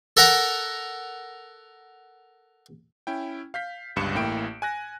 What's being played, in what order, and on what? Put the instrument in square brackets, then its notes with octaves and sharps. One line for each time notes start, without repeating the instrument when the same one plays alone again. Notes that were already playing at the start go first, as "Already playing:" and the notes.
[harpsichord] A4 A#4 F#5 A#5
[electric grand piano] C#4 E4 G5
F5 G6 B6
G1 C#2 G2 C#7 E7
A1 A2 A#3 E4 G5 D7
G#5 F#6 A#6